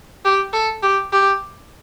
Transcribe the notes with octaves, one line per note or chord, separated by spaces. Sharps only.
G4
A4
G4
G4